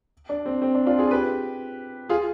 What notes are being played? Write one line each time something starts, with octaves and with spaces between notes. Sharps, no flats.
D4
C4
C4
D4
D4 F4
F4 G#4
G4 B4
F4 G#4